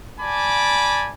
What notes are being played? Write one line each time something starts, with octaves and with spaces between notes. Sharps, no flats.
D5 G#5 A5 B5 D6